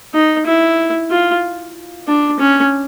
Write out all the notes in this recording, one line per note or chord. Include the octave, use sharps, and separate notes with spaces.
D#4
E4
F4
D4
C#4